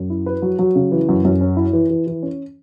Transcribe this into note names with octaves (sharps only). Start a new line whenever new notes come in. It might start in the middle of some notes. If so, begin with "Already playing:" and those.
Already playing: F#2
E4
B4
F#3
F#3
C#3
E3
F#2
F#2
C#4
E4
E3
E3
E3
C#4